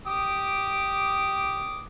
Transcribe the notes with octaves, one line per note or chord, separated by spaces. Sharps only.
G4 D6 D#6